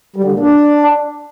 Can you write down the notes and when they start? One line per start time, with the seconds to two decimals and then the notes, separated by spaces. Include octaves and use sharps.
0.16 G3
0.24 D3
0.32 A#2
0.40 D4